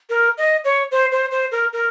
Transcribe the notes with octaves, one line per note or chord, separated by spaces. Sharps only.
A#4
D#5
C#5
C5
C5
C5
A#4
A#4